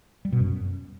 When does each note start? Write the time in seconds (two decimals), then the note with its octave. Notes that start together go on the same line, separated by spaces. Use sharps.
0.25 G3
0.32 B2
0.40 F#2